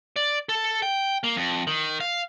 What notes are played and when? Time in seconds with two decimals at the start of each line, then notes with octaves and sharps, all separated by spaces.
0.16 D5
0.49 A4
0.82 G5
1.24 A#3
1.36 F2
1.67 D#3
2.00 F5